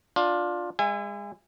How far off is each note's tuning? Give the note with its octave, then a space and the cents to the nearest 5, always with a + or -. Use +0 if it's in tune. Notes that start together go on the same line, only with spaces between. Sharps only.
D4 +0 F4 +15
G#3 -30 E5 +35 G#5 -25